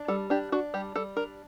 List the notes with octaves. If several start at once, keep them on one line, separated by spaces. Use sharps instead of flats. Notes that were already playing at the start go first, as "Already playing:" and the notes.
Already playing: D4
G3 A4
D4 G4
D4 F#4
G3 G4
G3 A4
D4 A#4